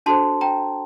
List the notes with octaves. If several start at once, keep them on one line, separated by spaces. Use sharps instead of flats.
D4 F#4 A4 C5 A5 C6
G5 A#5